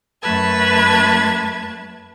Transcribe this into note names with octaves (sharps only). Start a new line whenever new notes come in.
F#2 A3 B4 A5 G#6